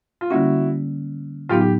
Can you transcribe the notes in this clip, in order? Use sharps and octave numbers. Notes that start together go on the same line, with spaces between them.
F4
D3 G3 A#3 C#4 E4 F#4
A2 F#3 B3 D#4 F4 G4
G4